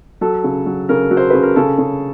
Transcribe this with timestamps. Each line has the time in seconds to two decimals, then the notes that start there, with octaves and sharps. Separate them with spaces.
0.21 F#3 A4
0.44 C#3
0.66 F#3
0.89 C#3 A#4
1.11 F#3
1.17 C5
1.30 C#3 B4
1.43 A#4
1.56 C#3 A4
1.78 C#3